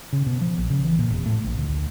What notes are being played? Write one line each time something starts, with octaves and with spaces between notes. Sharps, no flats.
C#3
B2
F3
A#1
C#3
E3
A#2
F1
A2
A#1
D2